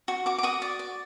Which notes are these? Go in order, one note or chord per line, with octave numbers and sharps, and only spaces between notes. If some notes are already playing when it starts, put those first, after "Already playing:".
F#4
F#4 D6
D6
F#4 D#6
D5
D5